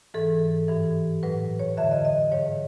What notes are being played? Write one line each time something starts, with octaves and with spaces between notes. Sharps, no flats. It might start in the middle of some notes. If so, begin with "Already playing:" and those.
G#2 E3 A4
G2 E3
A2 F#3 B4
C#5
F2 D3 F#3 E5
D#5
D#5
G#2 D#3 F#3 C#5